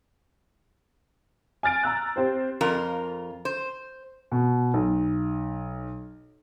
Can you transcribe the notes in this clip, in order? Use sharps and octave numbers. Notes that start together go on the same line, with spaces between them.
G#5 F6 A6 D7
A#5 E6 F#6
C4 G4 C5
F2 F4 A#4
C5
B2
B1